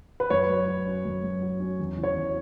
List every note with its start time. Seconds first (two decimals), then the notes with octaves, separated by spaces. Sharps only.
0.20 B4
0.30 F#2 C#5
0.49 F#3
0.68 F#4
0.87 C#4
1.05 F#2
1.23 F#3
1.41 F#4
1.60 C#4
1.79 E2
1.98 E3
2.03 C#5
2.16 E2